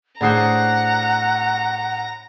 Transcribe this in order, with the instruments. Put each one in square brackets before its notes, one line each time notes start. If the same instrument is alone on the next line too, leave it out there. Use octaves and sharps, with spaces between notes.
[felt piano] A2 C7 [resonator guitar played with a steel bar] D4 G#4 C5 [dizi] F#5 [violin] A#5